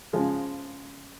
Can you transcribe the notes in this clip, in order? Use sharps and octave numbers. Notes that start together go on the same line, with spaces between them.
C#3 F3 G#3